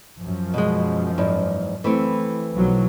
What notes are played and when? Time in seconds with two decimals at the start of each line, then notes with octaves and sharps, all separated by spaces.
0.19 F#2 F3
0.54 B2 G#3
1.18 E2 G#2
1.84 E3 A3 C4
2.54 B1 F3 F#3